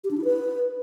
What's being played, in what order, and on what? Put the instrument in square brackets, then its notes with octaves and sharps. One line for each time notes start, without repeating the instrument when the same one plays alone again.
[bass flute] G4
D4
E4
B4